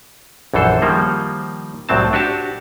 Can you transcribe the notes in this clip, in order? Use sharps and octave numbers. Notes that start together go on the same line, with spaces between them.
A#1 F#2 E3 A4 C5
D#3 F3 G3 A#3
C2 A2 F#3 C4 A5
D4 F#4 G4 A5